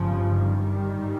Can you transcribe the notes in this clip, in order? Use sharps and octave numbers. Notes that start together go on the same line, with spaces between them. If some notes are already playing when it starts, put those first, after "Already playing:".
Already playing: G1 G2 C#3 F3
D#3 G3
G#2